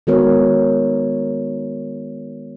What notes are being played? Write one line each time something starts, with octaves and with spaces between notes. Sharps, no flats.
D#3 G#3 B3 F#4 A#4 C#5